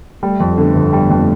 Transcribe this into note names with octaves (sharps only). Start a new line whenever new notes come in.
G3 A3
F2
A3
D3 B3
G1
G3 A3
F2
B3